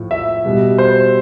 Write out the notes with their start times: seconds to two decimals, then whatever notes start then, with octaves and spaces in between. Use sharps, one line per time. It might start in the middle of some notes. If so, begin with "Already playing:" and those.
Already playing: A2 F3
0.11 E5
0.45 B2 G3
0.78 C5